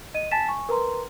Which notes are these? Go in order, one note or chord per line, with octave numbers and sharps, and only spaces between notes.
D#5 D#7
G#5 A5 A6 B6 E7
G#5 C#6
A#4 B4 A#5 C6